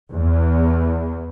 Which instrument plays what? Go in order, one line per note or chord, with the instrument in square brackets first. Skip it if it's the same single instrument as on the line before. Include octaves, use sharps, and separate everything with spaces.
[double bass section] E2